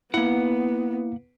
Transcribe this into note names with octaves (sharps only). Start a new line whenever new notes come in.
A#3 B3 E4 F#5